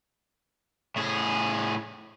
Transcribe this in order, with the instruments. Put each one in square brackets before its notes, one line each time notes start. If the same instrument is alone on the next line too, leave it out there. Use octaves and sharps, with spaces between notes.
[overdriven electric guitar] A2 G#4